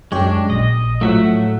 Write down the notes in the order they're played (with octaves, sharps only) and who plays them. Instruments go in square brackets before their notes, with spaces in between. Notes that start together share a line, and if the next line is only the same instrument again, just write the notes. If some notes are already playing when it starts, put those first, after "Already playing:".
[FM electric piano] F#2 G4 C#5 [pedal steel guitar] G#3 D4
[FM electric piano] A#1 [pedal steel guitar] D#5
[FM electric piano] A2 F3 F#3 [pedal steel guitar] A3 E5 F#5